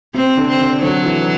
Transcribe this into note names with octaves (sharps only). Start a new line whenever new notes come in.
C3 C4
D3
C4
D3
D3 F#3
E3